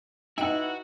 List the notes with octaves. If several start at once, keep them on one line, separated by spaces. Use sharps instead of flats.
D#4 E4 F#4 B4 F#5 G5